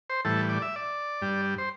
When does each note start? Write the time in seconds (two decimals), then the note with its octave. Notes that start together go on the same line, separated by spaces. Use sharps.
0.10 C5
0.25 A2 E3 G3 A4
0.49 D5
0.62 E5
0.76 D5
1.22 G2 G3
1.58 C5